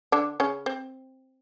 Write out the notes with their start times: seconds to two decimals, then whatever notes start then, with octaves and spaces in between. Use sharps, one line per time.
0.12 D3 D4
0.40 C#3 C#4
0.66 C4